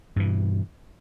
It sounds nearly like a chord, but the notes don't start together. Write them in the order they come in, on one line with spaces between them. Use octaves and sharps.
G2 E3 B2